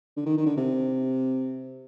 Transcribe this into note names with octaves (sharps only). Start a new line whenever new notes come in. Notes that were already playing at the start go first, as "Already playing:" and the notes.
D3
D#3
D#3
D3
C3